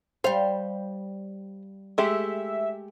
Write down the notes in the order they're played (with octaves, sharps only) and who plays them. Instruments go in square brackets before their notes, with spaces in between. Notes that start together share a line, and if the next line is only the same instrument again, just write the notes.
[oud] G3 F5 [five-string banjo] C5
[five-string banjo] G#3 A3 G4 [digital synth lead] E5